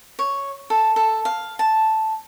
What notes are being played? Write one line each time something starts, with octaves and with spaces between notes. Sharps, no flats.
C#5
A4
A4
F5
A5